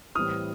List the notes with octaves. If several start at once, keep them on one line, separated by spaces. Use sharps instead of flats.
A2 E3 G3 C4 E4 D#6 F6